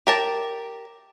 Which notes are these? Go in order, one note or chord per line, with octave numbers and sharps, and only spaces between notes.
G4 A#4 A5